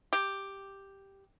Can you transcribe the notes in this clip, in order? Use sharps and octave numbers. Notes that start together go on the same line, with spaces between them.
G4